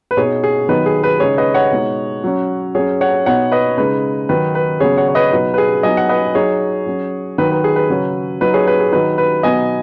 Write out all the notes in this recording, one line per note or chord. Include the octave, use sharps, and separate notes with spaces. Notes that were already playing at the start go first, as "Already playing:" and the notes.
B4
B2 B3 D#4 G#4 C#5
G#4
D#3 F#3 B3 D#4 B4
G#4
B4
C#3 G#3 D#4 G#4 C#5
B4 D#5
C#5 F#5
B2 G#3 D#4
F#3 C#4
F#3 C#4 G#4 C#5
C#5 F#5
B2 B3 D#4 C#5 F#5
B4 D#5
C#3 G#3 D#4 B4
D#3 F#3 D#4 B4
B4
C#3 F#3 B3 G#4 C#5
C#5 F#5
C#5
B4 D#5
B2 F#3 D#4 B4
B4
G#4
F#3 B3 D#4 D#5 G#5
F#5
B4 D#5
F#3 D#4 G#4 C#5
F#3 C#4
D#3 F#3 D#4 B4
B4
G#4
B4
C#3 F#3 C#4
F#3 D#4 B4
G#4 C#5
B4
G#4
D#3 F#3 D#4 B4
B4
B2 F#3 B3 D#4 D#5 G#5